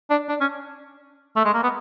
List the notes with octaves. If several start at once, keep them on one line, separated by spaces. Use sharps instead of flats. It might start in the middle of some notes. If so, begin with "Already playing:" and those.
D4
D4
C#4
A3
G#3
A#3
B3